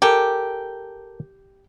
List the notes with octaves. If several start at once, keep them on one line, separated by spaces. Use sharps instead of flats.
G4 A4 A#4 G#5